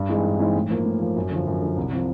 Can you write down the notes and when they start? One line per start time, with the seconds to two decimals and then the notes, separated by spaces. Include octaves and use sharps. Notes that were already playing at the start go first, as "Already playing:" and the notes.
Already playing: G2
0.09 E3 G#3 C4 D#4
0.25 G2
0.39 E3 G#3 C4 D#4
0.55 A2
0.70 F3 A#3
0.86 A2
1.01 F3 A#3
1.16 F#2
1.31 D3 F3
1.47 F#2
1.62 D3 F3
1.77 C2
1.92 C3 F3